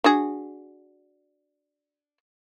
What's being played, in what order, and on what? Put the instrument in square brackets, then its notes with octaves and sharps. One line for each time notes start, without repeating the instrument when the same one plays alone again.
[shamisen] D4 F#4 G#4